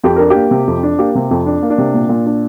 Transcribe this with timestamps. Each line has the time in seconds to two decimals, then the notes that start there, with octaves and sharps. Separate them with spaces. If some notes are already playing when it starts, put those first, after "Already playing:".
0.03 F2 G4
0.16 D4 A#4
0.30 G4
0.35 A#3
0.51 C3
0.67 F2
0.83 D4
0.99 A#3 G4
1.15 C3
1.31 F2
1.46 D4
1.62 A#3
1.70 D4
1.78 C3
1.94 A#2
2.09 A#2
2.26 D4